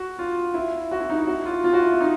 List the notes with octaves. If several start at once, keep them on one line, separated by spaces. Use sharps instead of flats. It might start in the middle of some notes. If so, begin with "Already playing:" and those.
Already playing: F#4
F4
E4
F#4
E4
D#4
E4
F#4
F4
F4
F#4
E4
E4
D#4